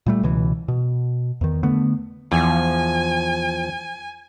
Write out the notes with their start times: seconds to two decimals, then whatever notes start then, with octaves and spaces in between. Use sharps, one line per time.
0.06 A#2 G3 A3
0.23 C#2 B2 E3
0.68 B2
1.41 E2 D#3
1.63 D3 A3 B3
2.32 E2 F3 G#5